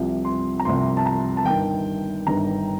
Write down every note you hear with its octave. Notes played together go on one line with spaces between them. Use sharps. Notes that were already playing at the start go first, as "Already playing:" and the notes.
Already playing: C2 C3 F3
C6
A#5
C2 C3 F3 C6
A5
A#5
A5
G1 G2 D#3 G5
G1 G2 D#3 A#5